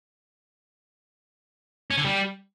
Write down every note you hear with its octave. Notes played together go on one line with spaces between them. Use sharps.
C#4
D3
G3